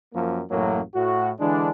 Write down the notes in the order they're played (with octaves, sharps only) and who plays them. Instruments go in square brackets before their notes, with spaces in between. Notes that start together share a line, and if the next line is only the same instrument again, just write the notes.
[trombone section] F#2 F3 A#3
A1 F#2 A2 F#3 A#3
A2 F#4
D3 E3 G#3 D4